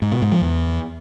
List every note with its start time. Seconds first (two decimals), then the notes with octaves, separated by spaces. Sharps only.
0.02 G#2
0.12 B2
0.22 G#2
0.32 F3
0.42 E2